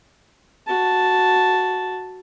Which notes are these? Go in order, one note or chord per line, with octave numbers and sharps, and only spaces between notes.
F#4 A5